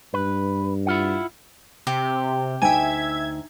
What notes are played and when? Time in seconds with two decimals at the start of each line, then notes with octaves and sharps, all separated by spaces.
0.14 G2 B4
0.87 E4 F4 F#5
1.87 C3 G4
2.62 D2 D#4 E5 G5 G#5 G#6